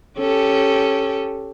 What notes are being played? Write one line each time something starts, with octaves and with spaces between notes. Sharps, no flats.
C#4 G4 A4